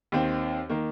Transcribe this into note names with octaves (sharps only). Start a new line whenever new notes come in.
D#2 D#3 C4
D#3 A#3